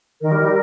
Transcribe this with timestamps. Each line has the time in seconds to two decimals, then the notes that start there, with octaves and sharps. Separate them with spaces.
0.21 D#3 A#4
0.31 G3
0.42 G3